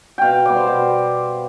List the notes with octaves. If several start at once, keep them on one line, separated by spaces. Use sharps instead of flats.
B2 F5 G5
G3 B3 D5
C5
B2